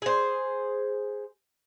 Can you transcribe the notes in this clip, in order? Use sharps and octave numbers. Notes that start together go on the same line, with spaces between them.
G#4 C5